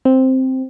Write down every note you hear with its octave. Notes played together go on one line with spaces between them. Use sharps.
C4